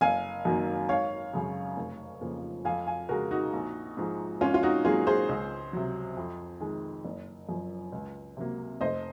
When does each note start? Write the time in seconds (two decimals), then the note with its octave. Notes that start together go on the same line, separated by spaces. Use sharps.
0.01 F#1 F5 G#5
0.45 F#2 D#3 F#3 A#3
0.89 G#1 C#5 F5
1.33 F#2 C#3
1.77 F1
2.21 F2 C#3 F3 A#3
2.65 F2 F5 G#5
2.87 F5 G#5
3.09 C#3 G#3 F#4 A#4
3.31 D#4 F#4
3.53 A#1
3.97 G#2 F3 G#3
4.41 G#1 C#4 F4
4.54 F4
4.63 D#4 F#4
4.85 G#2 F#3 A#3 F4 G#4
5.07 G#4 C5
5.29 C#2
5.73 C3 F#3
6.17 F2
6.61 D#3 G#3
7.05 F#1
7.49 F#2 F3
7.92 C#2
8.37 C3 F#3 A#3
8.81 F1 C5 D#5